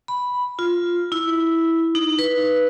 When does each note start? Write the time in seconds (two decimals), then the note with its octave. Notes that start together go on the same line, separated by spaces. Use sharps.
0.08 B5
0.59 F4
1.12 E4
1.95 D#4
2.19 B4